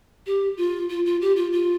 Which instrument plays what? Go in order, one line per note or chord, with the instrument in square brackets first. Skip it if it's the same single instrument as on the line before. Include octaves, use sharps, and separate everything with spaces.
[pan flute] G4
F4
F4
F4
G4
F4
F4